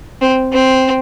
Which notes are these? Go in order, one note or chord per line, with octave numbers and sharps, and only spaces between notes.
C4
C4